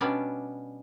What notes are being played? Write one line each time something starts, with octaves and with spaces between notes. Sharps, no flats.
B2 G3 B3 C#4 D4